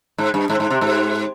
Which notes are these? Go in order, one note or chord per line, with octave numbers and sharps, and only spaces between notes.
G#2
G2
G#2
G#2
C3
G#2